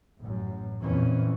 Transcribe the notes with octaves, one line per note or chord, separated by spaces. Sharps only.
A1 F#2
F2 A#2 E3 C#4